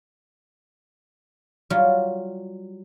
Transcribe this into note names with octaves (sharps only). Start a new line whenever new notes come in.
F#3 G3 F4